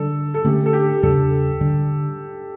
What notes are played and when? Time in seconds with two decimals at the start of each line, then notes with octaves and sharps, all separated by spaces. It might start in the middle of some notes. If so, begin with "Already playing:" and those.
Already playing: D3 G3 D4 A4
0.34 A4
0.45 D3 A3 C#4 G4
0.66 A4
0.73 G4
1.03 E2 C#3 G3 D4 A4
1.61 D3 G3 D4